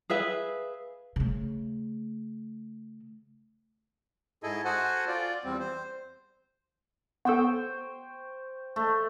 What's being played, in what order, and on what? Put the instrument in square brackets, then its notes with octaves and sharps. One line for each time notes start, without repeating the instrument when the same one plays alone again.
[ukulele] G#4 B4 E5 F5
[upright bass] C#3 A3
[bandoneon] G#2 E4 G#4 A4 D#5
F#4 A4 C5 F#5 G#5
F4 D5
E2 G3 C4
C5
[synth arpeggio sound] B3 A4 [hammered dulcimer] C5 G5 C#6
[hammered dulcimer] A3